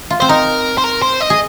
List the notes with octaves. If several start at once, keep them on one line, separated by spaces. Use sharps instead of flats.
F4
C4 C5
D#4 A#4
C5
A#4
C5
D#5
G#4